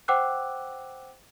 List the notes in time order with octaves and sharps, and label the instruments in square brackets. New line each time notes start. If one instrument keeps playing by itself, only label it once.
[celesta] C5 F#5 G5 D6 E6 F#6